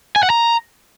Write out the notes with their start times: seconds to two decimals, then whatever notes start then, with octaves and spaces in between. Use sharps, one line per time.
0.16 G#5
0.23 F#5
0.30 A#5